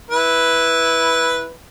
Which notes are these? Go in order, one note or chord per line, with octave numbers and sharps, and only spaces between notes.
E4 B4